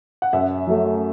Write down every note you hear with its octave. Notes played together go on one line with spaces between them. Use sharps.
F#5
F#2 E5
F#3 A3